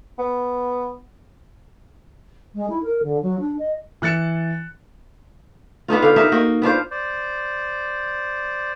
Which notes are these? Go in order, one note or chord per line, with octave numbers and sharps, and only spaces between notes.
B3
G#3
E4
A#4
D3
F#3
D4
D#5
E3 F#6 A6 C#7 E7
B3 D4 D#4 F4
D3 F5 G5
D#4 G4 A#4 E5
A#3 F#4 D#5
B3 D4 F4 C5
C5 D5